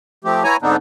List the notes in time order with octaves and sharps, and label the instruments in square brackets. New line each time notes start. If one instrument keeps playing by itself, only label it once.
[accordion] F3 A3 C4 G4
B3 E4 C#5 G#5 A#5
G#2 D3 B3 C4 D4 D#4